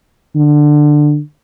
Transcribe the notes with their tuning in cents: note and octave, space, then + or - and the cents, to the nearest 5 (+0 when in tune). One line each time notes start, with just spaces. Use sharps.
D3 +15